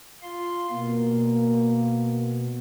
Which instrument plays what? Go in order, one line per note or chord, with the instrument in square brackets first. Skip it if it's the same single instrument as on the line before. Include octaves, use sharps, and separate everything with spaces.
[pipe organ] F4 C6
[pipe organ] B2 [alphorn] A#3